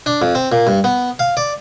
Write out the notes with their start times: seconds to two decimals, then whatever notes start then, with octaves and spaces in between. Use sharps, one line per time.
0.06 D4
0.22 F2
0.35 C4
0.52 A#2
0.67 G2
0.84 B3
1.19 F5
1.37 D5